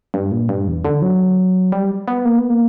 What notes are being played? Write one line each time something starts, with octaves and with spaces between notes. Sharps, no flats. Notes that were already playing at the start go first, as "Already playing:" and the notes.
G2
A#2
G2
E2
D3
F#3
G3
B3
A#3
B3
A#3